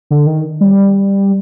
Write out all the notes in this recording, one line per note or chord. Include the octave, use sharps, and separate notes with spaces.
D3
D#3
G3